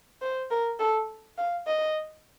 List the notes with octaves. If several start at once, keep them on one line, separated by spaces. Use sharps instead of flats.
C5
A#4
A4
F5
D#5